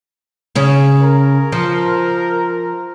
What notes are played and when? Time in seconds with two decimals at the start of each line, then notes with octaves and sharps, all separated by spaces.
0.55 C#3 C#4
1.02 A#4
1.52 F3